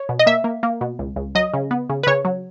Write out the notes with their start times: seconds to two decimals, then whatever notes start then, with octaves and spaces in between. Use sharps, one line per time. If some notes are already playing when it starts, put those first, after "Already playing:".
Already playing: C#5
0.09 B2
0.19 D#5
0.26 A#3 E5
0.44 A#3
0.63 A#3
0.81 B2
0.99 C#2
1.16 C#2
1.35 F#3 D#5
1.54 C#3
1.71 B3
1.89 C#3
2.03 B4
2.07 C#3 C#5
2.25 F#3